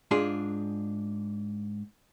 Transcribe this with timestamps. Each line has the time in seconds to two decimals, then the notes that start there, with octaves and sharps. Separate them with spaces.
0.11 G#2 D4 F4 G#4